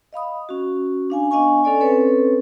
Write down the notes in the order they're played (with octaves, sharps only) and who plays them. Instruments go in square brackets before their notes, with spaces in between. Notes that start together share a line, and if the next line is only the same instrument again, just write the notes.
[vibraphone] D#5 F5 B5 D#6
C#4 F#4
D4 F5 G#5
B3 D4 D#5 F5 G#5 C#6
C#4 A4 D5 G#5
C4 C#4 A4 B4 C#5